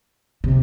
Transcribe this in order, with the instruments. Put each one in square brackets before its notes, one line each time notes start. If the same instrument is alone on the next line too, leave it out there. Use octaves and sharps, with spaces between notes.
[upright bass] C3